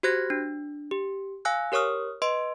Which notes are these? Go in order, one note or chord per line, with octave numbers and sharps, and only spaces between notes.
F#4 G4 C5 F#6 G#6 A#6
D4
G4
F5 G#5 E6 F#6
G4 A#4 C#5 C#6 D#6 F6
B4 D#5 C6 D7